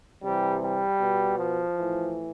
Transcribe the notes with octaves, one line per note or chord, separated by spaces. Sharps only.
C3 E3 G3
G3
B2
F3
A2 E3